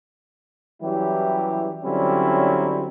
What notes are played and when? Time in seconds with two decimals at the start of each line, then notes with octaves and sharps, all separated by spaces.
0.82 E3 F#3 G3 C#4 E4 G4
1.84 D3 F#3 G3 C4 C#4 E4